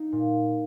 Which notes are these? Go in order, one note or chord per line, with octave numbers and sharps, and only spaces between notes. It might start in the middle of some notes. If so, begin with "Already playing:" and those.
Already playing: D#4
A#2